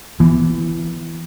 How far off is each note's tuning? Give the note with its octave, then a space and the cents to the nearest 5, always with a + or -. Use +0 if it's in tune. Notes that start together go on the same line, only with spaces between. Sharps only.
E3 +10 B3 -15